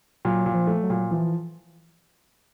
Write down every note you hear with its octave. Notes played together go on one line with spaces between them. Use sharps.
A#2 F#3
A#2
F3
A3
F#3
A#2
E3 F3